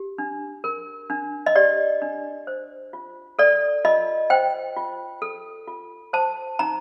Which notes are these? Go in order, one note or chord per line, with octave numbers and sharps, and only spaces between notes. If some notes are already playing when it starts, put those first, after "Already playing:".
Already playing: G4
D4
A#4
D4
D#5
G4 D5
D4
C5
F4
A4 D5
F4 D#5
C5 G5
F4
A4
F4
C5 A5
D#4 A#5